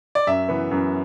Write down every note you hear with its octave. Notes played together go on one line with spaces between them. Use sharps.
D5
F#2 E5
E3 B3
F#2